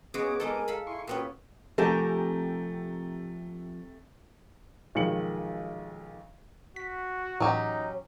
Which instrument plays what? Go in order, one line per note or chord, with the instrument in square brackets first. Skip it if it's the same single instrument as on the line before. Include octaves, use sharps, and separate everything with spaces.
[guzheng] G#3 F#4 G#4 [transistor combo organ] B3 D6 [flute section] C#4 D#6
[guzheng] G#3 D#4 A4 [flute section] A#4 G#5
[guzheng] A4 F5 B5
[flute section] E4 G#5 [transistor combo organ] C6 C#6
[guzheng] A#2 B3 C#4 [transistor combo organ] F#4 [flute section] B4 G5
[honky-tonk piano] C3 F#5 G#5 [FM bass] F3 [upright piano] A3 [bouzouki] G4 A#4 A5
[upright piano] B1 D#3 F3 G#3 C#7 F#7
[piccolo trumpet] F#4 [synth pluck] B6
[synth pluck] A2 E3 [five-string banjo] F#3 C#4 G4 [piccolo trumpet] D#4